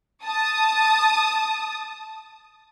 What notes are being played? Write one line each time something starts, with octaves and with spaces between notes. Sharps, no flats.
A5 D#6